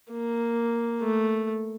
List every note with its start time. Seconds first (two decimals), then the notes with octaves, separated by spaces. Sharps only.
0.12 A#3
1.01 A3